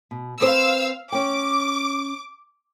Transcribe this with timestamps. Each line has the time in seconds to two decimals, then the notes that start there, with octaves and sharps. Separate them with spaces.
0.11 B2
0.41 C4 B4 C5 F5 E6
1.12 C#4 G5 D6